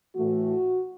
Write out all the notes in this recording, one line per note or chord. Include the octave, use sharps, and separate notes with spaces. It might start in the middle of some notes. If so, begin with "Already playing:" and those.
A2 E3 A3 F#4